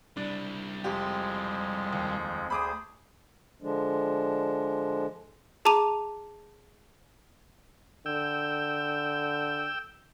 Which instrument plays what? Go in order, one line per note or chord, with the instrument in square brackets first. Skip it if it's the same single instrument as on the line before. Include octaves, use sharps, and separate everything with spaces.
[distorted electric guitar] G3 E4 [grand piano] D4
[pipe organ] F2 F3 G#3 [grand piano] G4
[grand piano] D#2
[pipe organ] D2 G#4 C5 [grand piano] B5 D6 D#6
[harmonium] D3 F3 G#3 D4
[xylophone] G#4 A5 A#5 D6 D#7 F7
[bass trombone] D3 [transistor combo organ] G5 E6